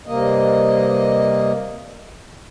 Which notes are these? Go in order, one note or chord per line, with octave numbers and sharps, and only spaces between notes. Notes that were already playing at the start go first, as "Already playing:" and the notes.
G2 C3 A#3 D#5